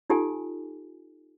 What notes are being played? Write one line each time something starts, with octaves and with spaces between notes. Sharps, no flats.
D#4 F4 G4 A4 G#5